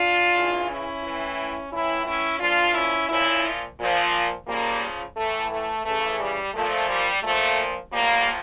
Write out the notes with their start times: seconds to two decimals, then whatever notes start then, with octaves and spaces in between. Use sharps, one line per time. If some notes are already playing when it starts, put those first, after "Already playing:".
Already playing: D4 F4
0.33 C#3 E3
0.67 C#4 E4
1.02 A2 E3
1.71 A2 E3 C#4 E4
2.06 C#4 E4
2.40 A#2 F3 D4 F4
2.74 C#4 E4
3.09 A#2 F3 C#4 E4
3.79 A#2 F3
4.47 C#3 F3 G3 A#3
5.16 A2 E3 A3
5.50 A3
5.85 C#3 E3 A3
6.20 G3
6.54 A#2 F3 A3
6.89 G3
7.23 A#2 F3 A3
7.92 A2 F3 G3 A#3